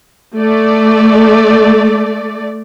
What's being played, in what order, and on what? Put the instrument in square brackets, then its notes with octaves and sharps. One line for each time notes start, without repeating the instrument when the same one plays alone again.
[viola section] A3 D5